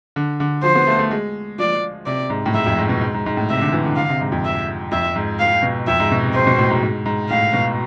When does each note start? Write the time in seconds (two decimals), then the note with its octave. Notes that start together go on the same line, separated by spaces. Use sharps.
0.16 D3
0.40 D3
0.63 F3 C5
0.75 B3
0.87 A3
0.99 A3
1.11 G#3
1.58 F3 D5
2.06 C3 D5
2.30 G#2
2.46 A2
2.54 G#2 E5
2.66 F2
2.78 G#2
2.89 B2
3.01 G#2
3.14 G#2
3.26 G#2
3.37 A2
3.50 C3 E5
3.61 D3
3.73 E3
3.85 D3
3.96 D3 F5
4.09 C3
4.21 G#2
4.32 F2
4.45 E5
4.91 F2 E5
5.16 G#2
5.39 F5
5.63 B2
5.87 F2 E5
6.00 G#2
6.11 B2
6.23 C3
6.34 G#2 C5
6.47 B2
6.58 A2
6.70 G#2
6.83 G#2
7.06 G#2
7.30 A2 F5
7.53 B2